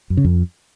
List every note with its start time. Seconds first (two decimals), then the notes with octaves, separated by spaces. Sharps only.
0.10 F#2
0.17 C#3
0.25 F2